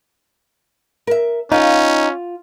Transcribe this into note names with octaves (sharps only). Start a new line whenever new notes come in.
A#4 E5
C#4 D#4 F4 F5 F#5